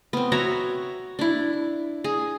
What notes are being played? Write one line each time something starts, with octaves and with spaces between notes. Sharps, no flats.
B3 C4
F#4 C#5 E5 A#5
D4 E4
G#4